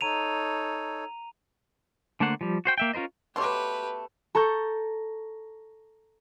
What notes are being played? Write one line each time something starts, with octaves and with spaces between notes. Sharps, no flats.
D#4 A4 C#5 A#5 D#7 F7
D3 A3 A#3 C5 F#5
F3 G3
F#4 C5 G5
A#3 E5 G5
C#4 F4 A#4 C5 D#5
B2 A3 G4 B4 C#5 C6 D6
A4 A#5 C#6 G6